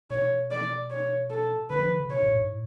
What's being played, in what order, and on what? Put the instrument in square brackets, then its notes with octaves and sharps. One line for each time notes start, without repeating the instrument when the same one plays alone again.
[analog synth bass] B2 [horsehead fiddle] C#5
[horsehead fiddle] D5
C#5
A4
[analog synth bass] D3 [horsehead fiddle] B4
[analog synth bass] F3
D3
C#3
[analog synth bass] B2 [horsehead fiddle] C#5
[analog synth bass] A2
G#2
A2